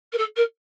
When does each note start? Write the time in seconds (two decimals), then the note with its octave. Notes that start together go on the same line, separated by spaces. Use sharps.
0.12 A#4
0.17 A4
0.36 A#4